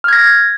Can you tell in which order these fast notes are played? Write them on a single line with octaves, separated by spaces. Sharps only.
F6 G#6 A#6